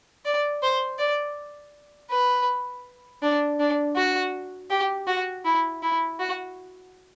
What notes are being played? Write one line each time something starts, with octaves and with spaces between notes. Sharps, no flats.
D5
C5
D5
B4
D4
D4
F#4
G4
F#4
E4
E4
F#4